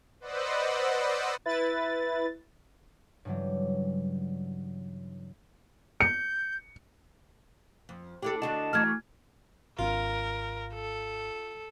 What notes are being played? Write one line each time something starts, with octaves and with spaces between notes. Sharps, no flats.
B4 C5 D5 D#5 F#5 E6
E4 B4 A6
G2 C#3 E3 F#3 G3
G6 C#7
F2
D4 E4 G4 A4
D3 D4 F#4 D#5 A5
E3 F#3 A3 F6 G#6
G#1 C4 D4 F4 A#4
A4